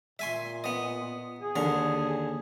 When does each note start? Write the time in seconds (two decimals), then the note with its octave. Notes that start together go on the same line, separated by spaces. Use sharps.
0.19 A#2 E5 G#5 C6
0.64 B3 D#5
1.41 G#4
1.56 D#2 D3 A#5